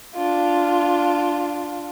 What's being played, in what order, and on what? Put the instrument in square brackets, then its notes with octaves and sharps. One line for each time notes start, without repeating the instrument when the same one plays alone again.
[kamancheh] D4 F4